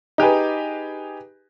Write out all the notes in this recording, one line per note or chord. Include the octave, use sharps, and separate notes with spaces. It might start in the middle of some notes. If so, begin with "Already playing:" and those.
D#4 G4 G#4 B4